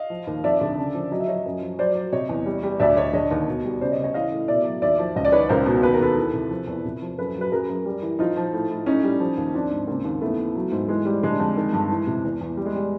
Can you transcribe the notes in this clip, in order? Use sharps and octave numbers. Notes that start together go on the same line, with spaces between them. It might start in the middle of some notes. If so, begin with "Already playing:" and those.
Already playing: D#5 F5
F3
D#2
F2 D5 E5
D3
C#3
F3
F#3 D#5
E5
F#3 C#5 D#5
F#2
F3
F#3 C5 D5
F#3
C3 C#5 D#5
E2
G3
G3
D2 D5 E5
D2 C#5 D#5
D3 C#5 D#5
D#2
B2
G3
C#3 C5 D5
C#5 D#5
C#3
C#5 D#5
E3 D#5 F5
A2
B2 D5 E5
F#3
D#2 D5 E5
F3
C#2 D#5
D5
D#3 B4 C#5
C#2 A#4 C5
B2
D#2 B4
A#4
D#2 A4 B4
E3
C3
F3
E2
C3
F3
F#2 A4 B4
F#3
B4
F#2 G#4 A#4
F#2
G3
E3
F3 D#4 F4
F3
A2
A2
A2 C#4 D#4
G3
F3
D#2
F3 C4 D4
G#2
C#3 A#3 C4
D#2
E3 A3 B3
E3
F#3
G#2
E3 G#3
G3
D3 G#3
F2
D#3
G2
E3
C3
E2
E2
G3
G#3
G3